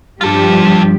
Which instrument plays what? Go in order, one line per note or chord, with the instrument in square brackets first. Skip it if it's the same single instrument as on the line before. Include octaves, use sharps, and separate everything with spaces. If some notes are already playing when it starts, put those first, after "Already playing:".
[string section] G2 [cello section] F3 G4 [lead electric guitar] F4 A4